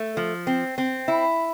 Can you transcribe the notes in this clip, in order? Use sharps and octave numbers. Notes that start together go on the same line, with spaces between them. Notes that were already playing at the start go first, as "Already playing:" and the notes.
Already playing: A3
F3
C4
C4
E4